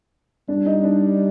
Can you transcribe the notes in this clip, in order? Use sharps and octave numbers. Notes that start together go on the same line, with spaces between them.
G3 D4
D#4
D4